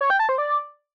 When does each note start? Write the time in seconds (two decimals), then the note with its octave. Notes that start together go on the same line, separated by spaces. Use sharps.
0.01 C#5
0.10 G5
0.19 A5
0.29 C5
0.38 D5